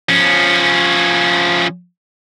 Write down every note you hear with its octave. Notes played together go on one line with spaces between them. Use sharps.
F3 C#4